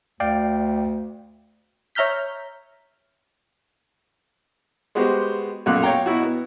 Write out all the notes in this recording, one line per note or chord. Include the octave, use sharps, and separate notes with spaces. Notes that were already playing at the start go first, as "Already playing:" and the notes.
D2 D5 F5 G5
C#5 E5 A#5 F6 G6 B6
G#3 B3 F#4 G4 C5
B1 F#2 A#2 F4 D6 F#6
C#5 F5 G5 A#5
B2 E4 F#4
B3